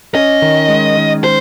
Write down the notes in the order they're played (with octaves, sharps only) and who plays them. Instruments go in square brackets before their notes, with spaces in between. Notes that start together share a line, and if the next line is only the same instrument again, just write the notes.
[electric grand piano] C#4 [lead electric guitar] D#5
[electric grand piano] D#3
G#3
D#3
[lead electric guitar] C5